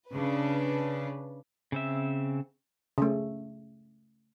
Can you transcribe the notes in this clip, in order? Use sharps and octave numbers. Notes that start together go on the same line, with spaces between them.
C#3 D4 B4
C#3 C4 E5
C#3 A3